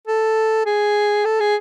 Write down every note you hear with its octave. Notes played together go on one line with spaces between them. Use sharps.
A4
G#4
A4
G#4